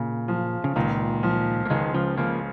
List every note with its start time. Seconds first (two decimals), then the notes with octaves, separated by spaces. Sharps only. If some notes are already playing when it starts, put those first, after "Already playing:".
Already playing: A#2 C#3
0.28 F3
0.64 C#3
0.76 C#2 A#2 D#3
1.23 F3
1.65 A#3
1.70 C#2 D#3 G#3
1.94 C#3 F3
2.18 C#3 F3 A#3